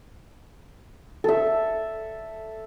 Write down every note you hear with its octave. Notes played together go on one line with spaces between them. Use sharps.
A4 E5